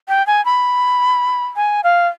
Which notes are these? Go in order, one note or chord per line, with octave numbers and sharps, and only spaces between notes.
G5
G#5
B5
G#5
F5